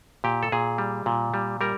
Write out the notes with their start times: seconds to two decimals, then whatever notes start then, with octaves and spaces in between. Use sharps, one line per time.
0.24 A#2 G4
0.43 A4
0.52 A#2 G#4
0.78 G3
1.06 A#2
1.34 G3
1.61 G3 A#4